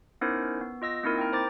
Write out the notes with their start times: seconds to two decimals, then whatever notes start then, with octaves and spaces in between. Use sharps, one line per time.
0.21 B3 C#4 D#4 E4 A#4 C5
0.61 B3
0.82 F4 D#5 E6 A#6
1.03 A#3 C4 D#4 E4 A#4
1.18 G5 A#5
1.33 C5 A#5 D6 A6